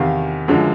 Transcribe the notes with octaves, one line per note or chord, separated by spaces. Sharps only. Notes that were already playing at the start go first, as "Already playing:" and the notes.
Already playing: E2 C3 D#3 F5
F#2 D3 F3 G#3